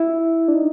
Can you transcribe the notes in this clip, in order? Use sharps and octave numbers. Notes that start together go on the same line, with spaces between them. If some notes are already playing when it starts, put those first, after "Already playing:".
Already playing: E4
D4
D#4